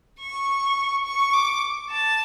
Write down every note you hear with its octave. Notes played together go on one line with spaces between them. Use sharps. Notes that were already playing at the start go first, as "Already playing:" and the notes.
C#6
C#6
D6
A5